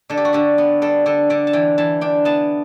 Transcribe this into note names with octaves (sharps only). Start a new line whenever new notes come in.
D3 A4
G4
F#4
D3 G4
B3
G3 A4
D3 A4
D3 D5
A5
E3 G5
E3 A5
D4 G5
B3 A5